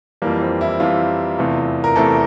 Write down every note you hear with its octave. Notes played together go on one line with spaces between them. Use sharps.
F2 E3 G3 A#3
C4
E4
F2 E3 G3 F4
E2 C3 E3 A3
A#4
E2 C3 E3 A3 A4